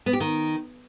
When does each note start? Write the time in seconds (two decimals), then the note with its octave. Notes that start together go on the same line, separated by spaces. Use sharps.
0.06 B3
0.13 G4
0.20 D#3